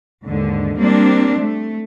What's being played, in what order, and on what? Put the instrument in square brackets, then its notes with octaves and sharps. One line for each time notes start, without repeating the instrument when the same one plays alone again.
[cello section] D#2 G#2 D3
G3 A#3 C4 D4
A3